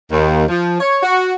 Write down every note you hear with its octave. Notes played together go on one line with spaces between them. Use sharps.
D#2
F3
C#5
F#4